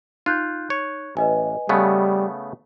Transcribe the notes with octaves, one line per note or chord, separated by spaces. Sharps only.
D#4 F4 F#6 G6
C#5
A1 B4 D#5 G#5
C#3 G3 A3 B3